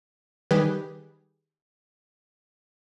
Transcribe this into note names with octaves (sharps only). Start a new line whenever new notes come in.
D#3 G3 G4 G#4 B4